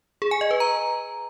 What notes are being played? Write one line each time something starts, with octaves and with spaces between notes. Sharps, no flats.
G#4
G#5
D#5
B4
A#5